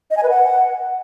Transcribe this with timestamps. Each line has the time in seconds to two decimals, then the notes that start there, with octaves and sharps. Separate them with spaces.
0.11 D#5
0.17 G#5
0.23 B4
0.30 F#5